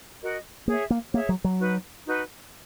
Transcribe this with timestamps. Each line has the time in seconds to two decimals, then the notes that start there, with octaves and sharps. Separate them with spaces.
0.21 F#4 A#4 D#5
0.67 A#3 G#4 C#5 E5
0.90 A#3
1.14 A#3 G#4 C#5 E5
1.29 F#3
1.44 F#3
1.60 D#4 F#4 B4
2.06 D#4 F#4 B4